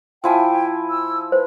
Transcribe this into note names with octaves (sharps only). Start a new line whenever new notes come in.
F3 E4 G5 G#5
E6
B4 C5